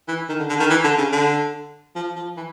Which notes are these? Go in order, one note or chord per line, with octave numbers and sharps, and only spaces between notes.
E3
D#3
D3
D3
D#3
E3
D3
C#3
D3
F3
F3
E3